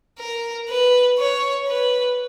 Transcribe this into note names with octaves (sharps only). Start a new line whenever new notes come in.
A#4
B4
C#5
B4